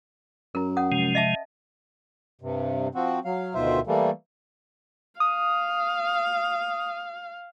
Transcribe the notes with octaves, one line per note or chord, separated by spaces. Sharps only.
F#2 A#4 A#5
C#4 F#5 D#6
C3 F3 G#3
D#5 E5 A5
G2 C3
F3 C4 F#4
F#3 F5
D2 B2 D#3 F4 C5 E5
E3 G3 A3 A#3
F5 D#6